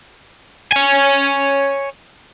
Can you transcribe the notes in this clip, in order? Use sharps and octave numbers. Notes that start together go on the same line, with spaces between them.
C#5 G#5